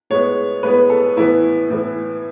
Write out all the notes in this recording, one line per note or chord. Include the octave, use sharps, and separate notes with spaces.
A2 G#3 B3 C#5
A2 G#3 B3 B4
A4
A2 E3 B3 E4
A2 E3 B3